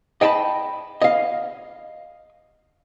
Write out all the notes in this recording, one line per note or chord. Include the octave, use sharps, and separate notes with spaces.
D#5 G5 A5 B5
D#5 F5